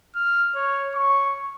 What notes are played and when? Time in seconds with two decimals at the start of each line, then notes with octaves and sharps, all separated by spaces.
0.15 F6
0.55 C#5
0.95 C#6